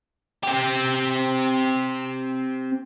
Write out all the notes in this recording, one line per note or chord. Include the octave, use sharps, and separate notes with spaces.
C4 G4